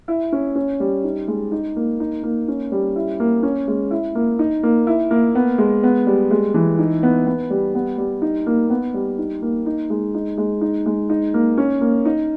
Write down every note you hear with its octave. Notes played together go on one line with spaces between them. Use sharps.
E4
C#4
C#4
G3
D#4
G#3
D#4
A#3
D#4
A#3
C#4
G3
E4
A#3
C#4
G#3
E4
A#3
D#4
A#3
E4
A#3
B3
G#3
B3
G3
G#3
E3
D#4
B3
B3
G3
B3
G3
D#4
A#3
B3
G3
D#4
A#3
D#4
G#3
D#4
G#3
D#4
G#3
D#4
A#3
C#4
A#3
D#4